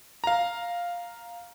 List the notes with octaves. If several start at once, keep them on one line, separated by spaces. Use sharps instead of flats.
F5 A#5